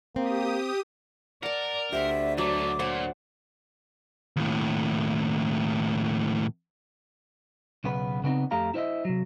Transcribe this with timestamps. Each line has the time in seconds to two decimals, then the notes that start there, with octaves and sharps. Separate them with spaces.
0.16 A#3 C4 G4 D#6
1.43 A#4 D5 F#5 A5
1.93 D2 D4 G4 C5 E5 F#5
2.38 D3 F#3 A3 D6
2.79 A#2 C5 F#5
4.36 D#2 A2
7.84 B1 C#3 B3 B4
8.24 C#3 B3 C4 D#4
8.51 F2 A3 G4 F5 A#5
8.74 E4 C5 C#5 D#5 E5
9.05 C3 F#3